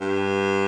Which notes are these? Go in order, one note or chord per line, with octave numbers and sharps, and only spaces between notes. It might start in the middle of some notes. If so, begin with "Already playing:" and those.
G2